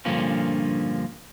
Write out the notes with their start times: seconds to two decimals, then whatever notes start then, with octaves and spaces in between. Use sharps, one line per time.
0.05 G2 A#2 D3 F3 A#3 C#4